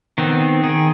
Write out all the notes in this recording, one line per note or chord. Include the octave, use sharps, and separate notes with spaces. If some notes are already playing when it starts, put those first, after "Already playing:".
D#3 B3 C4
D#3 G#4